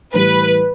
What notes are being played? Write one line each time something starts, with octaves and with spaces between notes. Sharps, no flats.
A2 E3 G3 B4